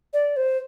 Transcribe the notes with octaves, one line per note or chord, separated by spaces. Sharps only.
D5
C5